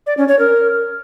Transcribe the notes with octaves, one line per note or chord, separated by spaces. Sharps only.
D5
C#4
C#5
A#4